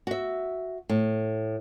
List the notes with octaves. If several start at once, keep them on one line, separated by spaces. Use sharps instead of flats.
F#4 E5
A2